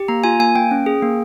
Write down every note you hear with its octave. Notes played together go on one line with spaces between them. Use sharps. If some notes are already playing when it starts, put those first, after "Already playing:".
Already playing: G4
A#3 A#5
F4 G#5
A#3 G#5
A#3 G5
C#4
G#4
A#3